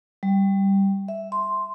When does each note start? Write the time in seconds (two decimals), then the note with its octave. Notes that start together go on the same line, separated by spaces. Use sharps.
0.23 G3
1.08 E5
1.32 C6